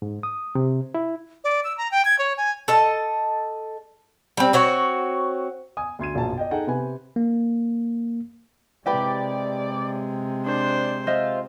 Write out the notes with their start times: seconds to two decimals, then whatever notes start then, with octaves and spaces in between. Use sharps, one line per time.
0.02 G#2
0.23 D#6
0.55 C3
0.94 E4
1.44 D5
1.64 E6
1.78 A#5
1.92 G5
2.05 G#6
2.19 C#5
2.37 G#5
2.68 A4 D#5 A5
4.37 G3 C4
4.53 C4 F#4 C#5
5.77 G#5 D#6
5.99 D2 C6 G#6 D#7
6.14 E1 A#1 F#2 F4 A5
6.38 D5 D#5 G5
6.51 D#4 G#4 A4 F#5 G5
6.67 C3 B4 G#5
7.16 A#3
8.86 C3 G#3 E4 G4 B4 D5
10.46 D4 C5
11.07 F4 C5 D#5 E5